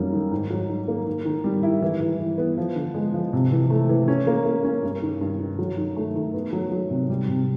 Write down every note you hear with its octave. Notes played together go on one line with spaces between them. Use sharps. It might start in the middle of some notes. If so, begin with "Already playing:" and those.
Already playing: F#2 D#3 G3 A#3
D#3
G#2
F#3
D#3
A#3
D#3
D#3
G3
E4
E3
E3
E3
B3
F3
D3
G#3
F3
C3
E3
A3
E3
C#4
A#3
A#3
C#4
G2
D#3
G2
D#3
F#3
D#3
A3
D#3
B3
F#3
F#3
C3
G3
C3